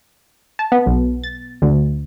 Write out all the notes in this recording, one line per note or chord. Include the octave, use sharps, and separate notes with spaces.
A5
B3
B1
A6
D2